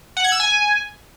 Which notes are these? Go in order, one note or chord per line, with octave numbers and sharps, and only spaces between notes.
F#5
G#6
E6
G#5